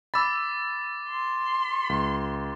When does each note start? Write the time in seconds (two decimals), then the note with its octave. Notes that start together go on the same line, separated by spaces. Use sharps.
0.14 B5 D6 E6 A6
1.09 C6
1.89 C#2